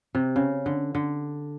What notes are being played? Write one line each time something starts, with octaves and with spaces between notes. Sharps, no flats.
C3
C#3
D3
D3